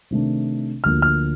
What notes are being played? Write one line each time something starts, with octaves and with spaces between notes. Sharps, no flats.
C3 D#3 A3 D4
D2 D3 F3 A#3 F6
F6